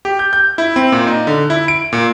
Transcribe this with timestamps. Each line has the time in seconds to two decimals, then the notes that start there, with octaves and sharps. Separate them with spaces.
0.05 G4
0.19 G6
0.33 G6
0.58 E4
0.76 C4
0.92 A#2
1.07 D#4
1.27 D3
1.50 E4
1.68 D7
1.93 A#2